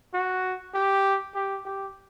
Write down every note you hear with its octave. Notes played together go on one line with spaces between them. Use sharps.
F#4
G4
G4
G4